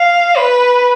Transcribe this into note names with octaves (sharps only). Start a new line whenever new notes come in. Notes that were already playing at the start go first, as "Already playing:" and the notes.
Already playing: F5
B4